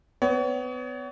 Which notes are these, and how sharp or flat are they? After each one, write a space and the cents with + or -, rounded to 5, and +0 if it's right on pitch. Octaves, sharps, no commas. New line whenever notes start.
B3 +30 C#5 +35